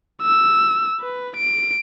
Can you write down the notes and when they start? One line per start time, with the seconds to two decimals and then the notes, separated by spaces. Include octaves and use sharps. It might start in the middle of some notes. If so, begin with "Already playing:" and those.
0.22 E6
1.00 B4
1.36 D7